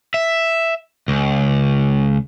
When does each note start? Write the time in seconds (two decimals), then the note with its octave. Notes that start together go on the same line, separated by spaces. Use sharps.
0.14 E5
1.08 C#2